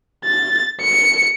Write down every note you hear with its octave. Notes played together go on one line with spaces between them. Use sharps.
A6
C#7